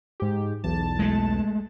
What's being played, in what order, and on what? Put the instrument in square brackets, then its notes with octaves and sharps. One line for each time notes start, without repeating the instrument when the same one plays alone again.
[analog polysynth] G#2 G4
B1 E2 A5
[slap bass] G#3 A3